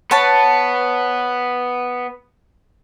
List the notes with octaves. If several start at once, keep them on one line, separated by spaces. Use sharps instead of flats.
B3 B4 C#5 A5